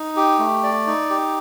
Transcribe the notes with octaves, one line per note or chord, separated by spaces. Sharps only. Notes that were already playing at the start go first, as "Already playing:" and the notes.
Already playing: D#4
G4
A3
D5
D#4
G4